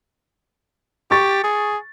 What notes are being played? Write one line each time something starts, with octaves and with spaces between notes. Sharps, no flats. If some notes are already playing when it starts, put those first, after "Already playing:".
G4 C#6 A6
G#4